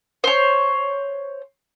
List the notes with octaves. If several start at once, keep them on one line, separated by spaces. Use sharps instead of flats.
C5 C#5